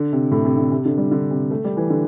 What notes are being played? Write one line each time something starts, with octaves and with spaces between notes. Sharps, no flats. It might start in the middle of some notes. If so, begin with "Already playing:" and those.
Already playing: D3
C3
A2
C3
D3
C3
D3
G3
D3
C3
A3
G3
E3
D3